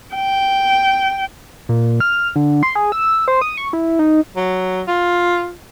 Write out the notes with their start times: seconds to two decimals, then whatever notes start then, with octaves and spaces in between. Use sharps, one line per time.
0.15 G5
1.69 A#2
2.00 F6
2.36 D3
2.63 C6
2.75 G#4
2.92 E6
3.28 C5
3.41 D#6
3.57 C#6
3.73 E4
3.99 D#4
4.36 F#3
4.87 F4